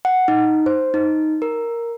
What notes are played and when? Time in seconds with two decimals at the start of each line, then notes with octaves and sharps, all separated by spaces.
0.05 F#5
0.28 D#4
0.66 C5
0.94 D#4
1.42 A#4